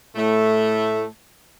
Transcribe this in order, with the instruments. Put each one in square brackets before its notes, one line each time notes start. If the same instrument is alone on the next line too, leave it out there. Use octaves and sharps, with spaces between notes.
[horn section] A2 A3